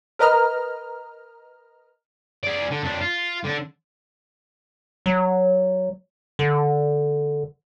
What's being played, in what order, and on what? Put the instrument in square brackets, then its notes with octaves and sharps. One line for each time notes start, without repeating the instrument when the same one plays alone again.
[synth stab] A#4 B4 D#5 A#5 F6
[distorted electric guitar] G#4 D5
D3
F2 D4
F4
D3 D4
[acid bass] F#3
D3